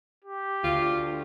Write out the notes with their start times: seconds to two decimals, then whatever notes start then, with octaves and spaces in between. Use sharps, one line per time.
0.24 G4
0.64 D2 F4